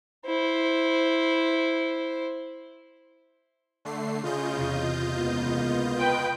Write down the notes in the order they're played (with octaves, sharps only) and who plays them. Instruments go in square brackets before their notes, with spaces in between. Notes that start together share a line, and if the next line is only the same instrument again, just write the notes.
[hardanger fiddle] E4 C5
[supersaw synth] D3 A3 C7
[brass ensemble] C#3 [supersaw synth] F4 D#5 G6
[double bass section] E2 C3
[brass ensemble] C#2 A#3 B3
[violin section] B4 G5